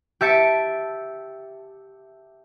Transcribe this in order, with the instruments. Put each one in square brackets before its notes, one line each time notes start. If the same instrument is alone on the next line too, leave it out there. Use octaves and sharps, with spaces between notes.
[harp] G4 E5 A5 C#7 D7